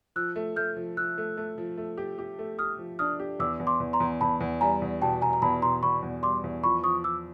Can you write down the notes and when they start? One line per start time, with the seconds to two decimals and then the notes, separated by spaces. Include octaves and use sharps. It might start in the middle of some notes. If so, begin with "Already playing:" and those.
0.16 F3 E6 F#6
0.36 A3
0.56 A3 F6 G6
0.76 F3
0.97 F3 E6 F#6
1.18 A3
1.37 A3
1.58 F3
1.77 A3
1.97 G4
2.19 G4
2.39 A3
2.59 G4 D#6 F6
2.79 F3
2.99 D4 D#6 F6
3.20 G4
3.39 E2 D6 E6
3.60 E2
3.67 C6 D6
3.80 E2
3.93 A#5 C6
4.00 E2
4.21 E2 A5 B5
4.40 E2
4.61 G3 G#5 A#5
4.82 E2
5.01 B2 G5 A5
5.22 B2 G#5 A#5
5.33 A#5
5.42 E2 A5 B5
5.62 B2 A#5 C6
5.83 E2 B5 C#6
6.03 E2
6.23 G3 C6 D6
6.44 E2
6.64 F3 B5 C#6
6.83 F3 C#6 D#6
7.04 F3 D6 E6